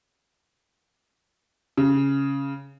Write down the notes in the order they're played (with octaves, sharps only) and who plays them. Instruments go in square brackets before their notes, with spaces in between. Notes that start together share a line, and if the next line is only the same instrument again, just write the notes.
[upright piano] C#3